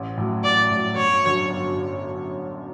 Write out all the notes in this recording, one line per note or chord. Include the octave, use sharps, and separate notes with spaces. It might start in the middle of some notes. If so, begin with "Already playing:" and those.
Already playing: A1
A2 F#3
A1 D5
A2 F#3
G1 C#5
F#2 D3 F#3
G1